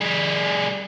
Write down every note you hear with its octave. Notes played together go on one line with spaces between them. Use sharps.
G3 G#4